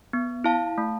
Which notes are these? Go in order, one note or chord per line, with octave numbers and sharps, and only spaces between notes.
B3
E4 F5 A5
A3